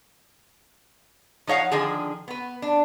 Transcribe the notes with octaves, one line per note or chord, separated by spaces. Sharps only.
F3 D#4 C#5 F5 F#5
D3 D#3 F3 G#4
B3 B4
D4